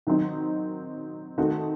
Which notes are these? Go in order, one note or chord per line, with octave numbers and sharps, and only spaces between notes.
D#3 F#3 C4 D#4
D#3 A3 C4 F#4